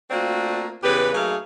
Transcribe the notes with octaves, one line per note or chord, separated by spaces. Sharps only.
A3 A#3 C4 D4 F4 F#4
E2 C#3 G4 B4
F#3 A3 A#3 D#4 G#4 F5